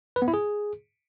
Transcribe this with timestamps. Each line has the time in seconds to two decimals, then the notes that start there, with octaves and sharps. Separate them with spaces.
0.16 B4
0.22 B3
0.28 E4
0.34 G#4